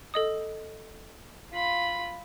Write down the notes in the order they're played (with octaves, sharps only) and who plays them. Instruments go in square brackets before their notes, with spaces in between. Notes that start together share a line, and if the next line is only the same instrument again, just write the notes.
[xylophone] A4 D#5 D#6
[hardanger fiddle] F4 B5